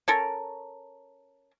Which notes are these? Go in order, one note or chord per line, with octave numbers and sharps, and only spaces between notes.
C#4 A4 A#4